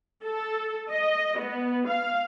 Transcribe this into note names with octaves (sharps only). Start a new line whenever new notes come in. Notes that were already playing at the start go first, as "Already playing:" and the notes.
A4
D#5
B3
F5